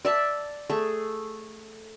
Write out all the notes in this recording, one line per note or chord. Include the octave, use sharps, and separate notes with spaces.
D5 E5 A5
A3 G#4